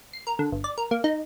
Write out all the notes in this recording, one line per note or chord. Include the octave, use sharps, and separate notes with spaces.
C7
A#4
D3
G1
D5
A#4
A#3
D#4